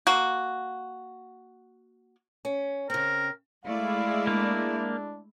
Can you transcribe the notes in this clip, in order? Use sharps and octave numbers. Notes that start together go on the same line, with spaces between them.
A#3 F#4
C#4
C#3 C4 A#4
G#3 A3 E4 D5 F5
A#3 D4